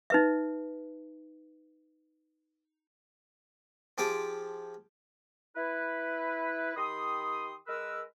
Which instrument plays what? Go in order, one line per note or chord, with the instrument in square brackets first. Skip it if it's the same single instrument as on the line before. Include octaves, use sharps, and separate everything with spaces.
[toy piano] D#4 B4 E5
[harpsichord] F3 G4 G#4 C5 G5 A5
[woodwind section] E4 B4
D#3 G4 B5 C6 D#6
G#3 A#4 B4 E6